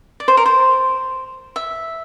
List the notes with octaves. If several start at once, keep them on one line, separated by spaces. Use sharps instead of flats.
D5
C5
A#4
C5
E5